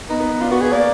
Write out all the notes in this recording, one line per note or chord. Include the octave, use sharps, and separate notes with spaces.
B3 D#4
B3
B3
D4 F4
B3 F#4
B3 G#4
A#3 D5